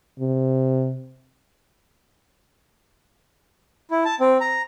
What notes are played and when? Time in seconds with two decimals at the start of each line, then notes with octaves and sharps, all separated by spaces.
0.19 C3
3.91 E4
4.05 A5
4.20 C4
4.41 A#5